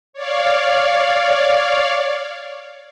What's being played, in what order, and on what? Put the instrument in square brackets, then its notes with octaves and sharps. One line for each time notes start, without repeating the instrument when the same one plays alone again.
[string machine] C#5 D5 F5